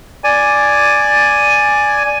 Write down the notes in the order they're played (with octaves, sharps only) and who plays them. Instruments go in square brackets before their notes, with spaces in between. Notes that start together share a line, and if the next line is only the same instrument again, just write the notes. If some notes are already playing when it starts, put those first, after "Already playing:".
[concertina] D5 G#5